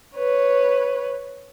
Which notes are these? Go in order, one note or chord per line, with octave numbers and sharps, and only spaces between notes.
B4 C#5